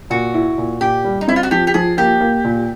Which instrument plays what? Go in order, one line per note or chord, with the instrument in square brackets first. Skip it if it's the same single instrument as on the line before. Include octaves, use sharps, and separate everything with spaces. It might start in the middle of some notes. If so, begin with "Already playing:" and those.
[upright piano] A#2 [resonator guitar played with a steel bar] F#4
[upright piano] E4
A#2
[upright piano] A#2 [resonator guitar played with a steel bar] G4
[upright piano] G3
[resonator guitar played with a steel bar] D#4
[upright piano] C4 [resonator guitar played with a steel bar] E4
[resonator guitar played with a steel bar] F4
F#4
[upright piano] F3 [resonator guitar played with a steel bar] G4
[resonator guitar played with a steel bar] G4
[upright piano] F3 [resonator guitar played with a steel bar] G#4
[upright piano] A#3 [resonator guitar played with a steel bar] G4
[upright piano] A#3
A#2